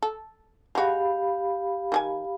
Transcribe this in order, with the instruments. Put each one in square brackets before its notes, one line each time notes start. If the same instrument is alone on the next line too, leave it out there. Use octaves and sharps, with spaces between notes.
[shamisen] A4
[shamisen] G#3 F#4 [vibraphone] G4 F5 B5
[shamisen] D#3 G#4 G#5